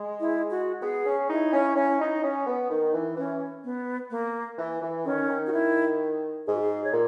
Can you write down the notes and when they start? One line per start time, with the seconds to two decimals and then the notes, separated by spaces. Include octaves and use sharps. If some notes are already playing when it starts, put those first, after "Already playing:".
Already playing: G#3
0.20 E4
0.51 F#4
0.82 B3 G#4
1.06 C#4
1.30 D#4 E4
1.53 C#4
1.76 C#4
2.00 D#4
2.23 C#4
2.46 B3
2.70 D#3 D#4
2.94 E3
3.17 E3 C#4
3.64 B3
4.11 A#3
4.58 E3
4.82 E3
5.05 D#3 C#4
5.29 D#3
5.47 F#4
5.53 E4
6.46 G#2 G#4
6.54 F#4
6.62 G#4
6.84 C#5
6.93 A#2